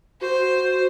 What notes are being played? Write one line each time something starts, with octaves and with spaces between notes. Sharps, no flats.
F#4 C5